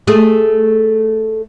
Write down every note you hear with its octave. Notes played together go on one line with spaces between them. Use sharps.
A3 G#4